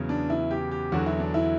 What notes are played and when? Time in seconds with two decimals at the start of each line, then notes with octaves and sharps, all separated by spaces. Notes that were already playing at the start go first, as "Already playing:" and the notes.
Already playing: E2 C#3 F#3 B3
0.09 D4
0.30 E4
0.51 G4
0.71 G4
0.92 E2 D3 F#3 F#4
1.06 E4
1.20 D4
1.34 E4